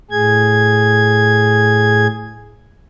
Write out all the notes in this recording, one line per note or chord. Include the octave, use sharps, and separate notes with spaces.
A2 G#4 G#6